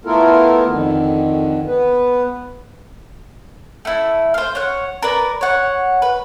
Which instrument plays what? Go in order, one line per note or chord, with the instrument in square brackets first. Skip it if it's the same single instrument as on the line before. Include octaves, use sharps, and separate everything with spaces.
[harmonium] A3 B3 E4 F4 A4 A#4
F2 D3 D#3
B3 B4
[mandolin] A3 E4
C5 F5
C#5 F#5
A#4 B4 D5
C#5 F#5
B4